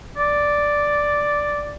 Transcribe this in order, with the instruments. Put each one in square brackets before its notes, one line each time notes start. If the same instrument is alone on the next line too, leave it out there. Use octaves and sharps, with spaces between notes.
[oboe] D5